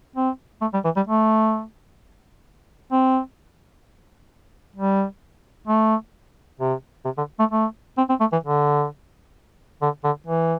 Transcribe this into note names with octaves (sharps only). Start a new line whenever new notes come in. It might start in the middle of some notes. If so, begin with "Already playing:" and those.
C4
A3
G3
E3
G3
A3
C4
G3
A3
C3
C3
D3
A3
A3
C4
C4
A3
E3
D3
D3
D3
E3